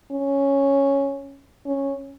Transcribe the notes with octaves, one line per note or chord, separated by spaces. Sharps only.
C#4
C#4